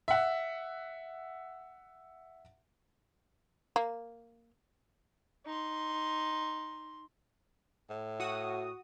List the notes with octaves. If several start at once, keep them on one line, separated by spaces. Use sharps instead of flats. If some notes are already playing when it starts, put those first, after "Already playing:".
E5 F#5
A#3
D#4 C6
A2
F#4 D#6